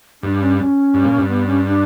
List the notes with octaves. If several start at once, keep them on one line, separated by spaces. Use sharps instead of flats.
G2 D4
C#4
C#4
G2
A#2
G2
B3
C#4
D4